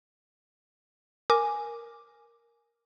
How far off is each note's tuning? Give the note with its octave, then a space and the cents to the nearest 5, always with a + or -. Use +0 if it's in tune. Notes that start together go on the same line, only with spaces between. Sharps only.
A#4 +0 G#5 +0 D6 +0